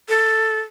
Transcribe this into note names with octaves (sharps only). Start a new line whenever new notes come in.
A4